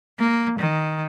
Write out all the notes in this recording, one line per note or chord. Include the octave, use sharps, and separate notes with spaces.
A#3
D#3